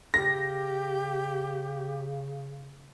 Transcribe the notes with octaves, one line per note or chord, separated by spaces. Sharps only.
C#3 G4 A#6